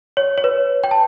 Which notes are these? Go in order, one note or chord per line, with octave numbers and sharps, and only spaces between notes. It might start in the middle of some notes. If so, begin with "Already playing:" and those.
C#5
C#5
B4
G5
A5